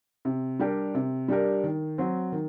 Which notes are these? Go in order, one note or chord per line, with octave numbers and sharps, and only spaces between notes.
C3
G3 D4 G4 A#4
C3
G3 D4 G4 A#4
D#3
F#3 C4
D#3